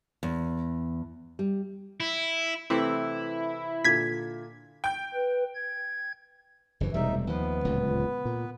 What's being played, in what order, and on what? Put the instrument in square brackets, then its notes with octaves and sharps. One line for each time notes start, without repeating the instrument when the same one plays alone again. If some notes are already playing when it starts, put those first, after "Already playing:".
[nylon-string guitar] E2
G3
[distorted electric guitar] E4
[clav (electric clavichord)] C3 E3 C4 [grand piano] A3 [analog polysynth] E4
[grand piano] A#2 D3 [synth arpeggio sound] G#6 B6
[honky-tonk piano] G5 G6
[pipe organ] B4
G#6
[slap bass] F#1 G2 E3
[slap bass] E1 C3 G3 [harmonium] D2 D#4 E5
[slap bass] D#2 F3 [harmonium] B3 B4
[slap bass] D1 C#2 A#2
A#2